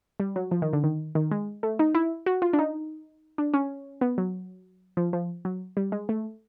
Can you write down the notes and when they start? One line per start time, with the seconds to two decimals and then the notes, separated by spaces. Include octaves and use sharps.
0.20 G3
0.36 F#3
0.51 F3
0.62 D#3
0.73 D3
0.83 D#3
1.15 D#3
1.31 G#3
1.63 A3
1.79 D#4
1.95 E4
2.26 F#4
2.42 F4
2.53 D4
2.59 D#4
3.38 D4
3.54 C#4
4.01 B3
4.18 F#3
4.97 F3
5.13 F3
5.45 F#3
5.77 G3
5.92 G#3
6.09 A3